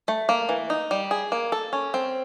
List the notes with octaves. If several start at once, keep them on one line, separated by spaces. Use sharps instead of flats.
A3
A#3
E3
D#4
G3
G#4
A#3
A4
C#4
C4